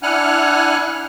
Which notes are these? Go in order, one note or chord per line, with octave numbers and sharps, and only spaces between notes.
D4 E4 F#5 G#5 F6 F#6